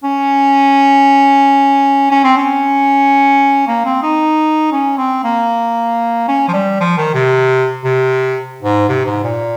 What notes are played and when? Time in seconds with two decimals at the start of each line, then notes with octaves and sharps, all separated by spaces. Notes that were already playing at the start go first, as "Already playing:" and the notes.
0.04 C#4
2.11 C#4
2.24 C4
2.37 C#4
3.67 A#3
3.85 C4
4.02 D#4
4.72 C#4
4.98 C4
5.24 A#3
6.28 C#4
6.48 F3
6.53 G3
6.80 F3
6.98 D#3
7.14 C3
7.84 C3
8.63 G#2
8.89 C3
9.06 G#2
9.23 A#2